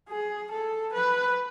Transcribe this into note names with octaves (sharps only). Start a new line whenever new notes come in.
G#4
A4
B4